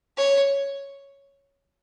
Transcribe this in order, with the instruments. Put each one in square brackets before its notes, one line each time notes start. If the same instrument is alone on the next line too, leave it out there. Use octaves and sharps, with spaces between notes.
[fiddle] C#5